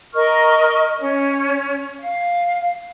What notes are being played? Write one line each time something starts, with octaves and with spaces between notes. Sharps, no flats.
A#4 D#5 C#6 F6
C#4 C#5
F5